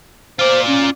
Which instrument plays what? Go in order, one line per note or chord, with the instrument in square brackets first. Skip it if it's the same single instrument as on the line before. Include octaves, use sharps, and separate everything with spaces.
[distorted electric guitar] F4 D5 [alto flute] C5
[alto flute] C#4